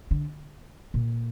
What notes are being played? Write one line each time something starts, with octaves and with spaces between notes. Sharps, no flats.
D3
A#2